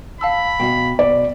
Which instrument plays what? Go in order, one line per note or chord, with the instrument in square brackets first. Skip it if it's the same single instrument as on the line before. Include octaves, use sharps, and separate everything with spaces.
[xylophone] F5 A5 E6 [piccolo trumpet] B5
[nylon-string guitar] B2 F5 [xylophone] G5
[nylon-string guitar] B2 [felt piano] D5